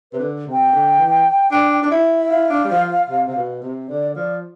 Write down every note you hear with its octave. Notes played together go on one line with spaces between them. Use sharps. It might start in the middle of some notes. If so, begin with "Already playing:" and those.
C3 B4
D3
C3
G5
D3
E3
D4
D4
E4
E5
E4 F5
D4
G3
F3
C3
C3
B2
C3
D3 D5
F3 D5